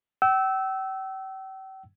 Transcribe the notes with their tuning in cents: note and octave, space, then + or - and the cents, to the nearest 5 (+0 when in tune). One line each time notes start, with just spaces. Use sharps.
G5 -40 E6 -10